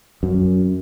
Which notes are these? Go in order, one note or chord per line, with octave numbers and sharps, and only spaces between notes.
F#2